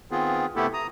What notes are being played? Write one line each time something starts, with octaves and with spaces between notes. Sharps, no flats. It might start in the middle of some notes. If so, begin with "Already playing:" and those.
D#3 B3 C4 F4 G#4
C3 A3 B3 E4 G4 A4
A#5 D#6